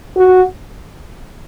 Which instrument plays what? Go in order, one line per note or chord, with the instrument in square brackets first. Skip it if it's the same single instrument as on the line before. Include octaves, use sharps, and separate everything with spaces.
[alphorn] F#4